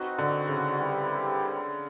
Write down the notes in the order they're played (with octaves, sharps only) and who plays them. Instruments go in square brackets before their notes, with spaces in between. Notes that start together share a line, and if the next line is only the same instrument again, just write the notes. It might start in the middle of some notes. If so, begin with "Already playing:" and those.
Already playing: [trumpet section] C4 D#4 F#4 B4
[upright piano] D3
C#3
[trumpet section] G3 C4 E4 G4 B4